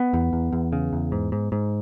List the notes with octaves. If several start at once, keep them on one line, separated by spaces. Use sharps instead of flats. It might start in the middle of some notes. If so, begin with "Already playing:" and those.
Already playing: B3
E2
E2
E2
C#3
E2
G#2
G#2
G#2